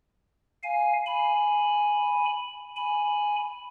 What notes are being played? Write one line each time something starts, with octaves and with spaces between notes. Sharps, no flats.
F5 G#5
G#5 B5
G#5 B5